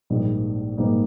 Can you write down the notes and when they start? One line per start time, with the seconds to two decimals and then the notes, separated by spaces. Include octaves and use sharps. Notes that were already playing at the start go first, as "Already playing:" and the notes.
0.10 A#1 G#2 G3 A#3 D#4
0.77 A#1 G#2 G3 A#3 D#4